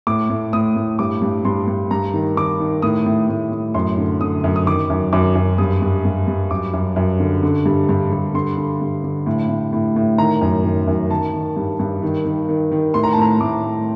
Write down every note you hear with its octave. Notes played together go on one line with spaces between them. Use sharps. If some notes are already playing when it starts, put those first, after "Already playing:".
A2 D6
A2
A2 D#6
A2
G2 D6
G2
G2 C6
G2
G2 A#5
D#3
D#3 D6
D#3
A2 D#6
A2
A2
A2
F#2 C6
D3
D3 D#6
F#2
D#6
D#3 D6
F#2
F#2 D6
F#2
G2 D#6
G2
G2
G2
F#2 D6
F#2
F#2
D3
D3
G2
G2
G2
D3 C6
D3
G2
D3
A2
A2
A2
A2
D#3 A#5
F#2
D#3
F#2
D#3 A5
D#3
G2
G2
D#3
D#3
D#3
D#3
A2 C6
A#5
A5
A2 A#5
A2 D6
A2